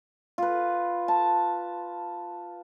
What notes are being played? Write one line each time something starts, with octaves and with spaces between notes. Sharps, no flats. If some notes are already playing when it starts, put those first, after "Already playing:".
F4 B4
A5